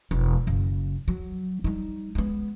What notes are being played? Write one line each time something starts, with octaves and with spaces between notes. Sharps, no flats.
E1
F#1 C#3
F#3
G3 D#4
G#3 B3